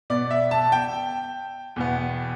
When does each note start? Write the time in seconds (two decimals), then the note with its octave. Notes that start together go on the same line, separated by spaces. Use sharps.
0.10 B2 B3 D5
0.31 E5
0.51 A5
0.72 G5
1.76 E2 B2 B3